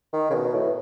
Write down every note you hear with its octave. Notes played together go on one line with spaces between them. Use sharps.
D#3
C#3
B2
A2